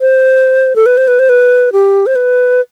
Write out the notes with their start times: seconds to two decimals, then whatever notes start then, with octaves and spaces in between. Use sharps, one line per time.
0.01 C5
0.76 A4
0.86 B4
0.97 C5
1.08 B4
1.19 C5
1.29 B4
1.73 G4
2.06 C5
2.16 B4